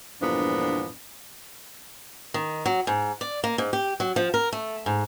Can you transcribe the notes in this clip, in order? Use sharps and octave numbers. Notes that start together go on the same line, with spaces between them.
E2 G2 A#2 F3 B3 D4
D#3
F#3
G#2
D5
A#3
G#2
G4
F#3
F3
A#4
A3
G#2